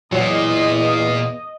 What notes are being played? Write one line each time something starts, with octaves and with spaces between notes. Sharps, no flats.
E2 A#2 F#3 D#5